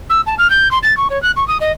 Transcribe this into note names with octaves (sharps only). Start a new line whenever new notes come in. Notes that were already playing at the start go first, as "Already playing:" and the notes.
E6
A5
F6
G6
C6
A6
C#6
C#5
F#6
C#6
D#6
D#5